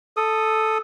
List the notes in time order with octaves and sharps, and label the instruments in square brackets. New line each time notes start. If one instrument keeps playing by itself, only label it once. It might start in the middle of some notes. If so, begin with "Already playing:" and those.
[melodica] A4 D#6